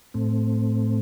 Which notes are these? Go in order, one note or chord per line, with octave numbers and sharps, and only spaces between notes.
A2 A3 C4